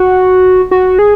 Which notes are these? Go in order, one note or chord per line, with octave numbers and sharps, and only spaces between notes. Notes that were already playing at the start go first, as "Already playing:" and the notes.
Already playing: F#4
F#4
G#4